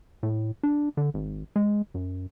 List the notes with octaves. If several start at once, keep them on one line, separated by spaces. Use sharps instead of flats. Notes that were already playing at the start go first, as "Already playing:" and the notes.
A2
D4
D3
G#1
G#3
F#2